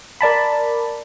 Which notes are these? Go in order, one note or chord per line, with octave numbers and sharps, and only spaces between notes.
A#4 D5 A5 B5